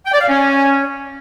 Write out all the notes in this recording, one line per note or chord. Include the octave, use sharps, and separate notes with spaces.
G5
D5
F5
C#4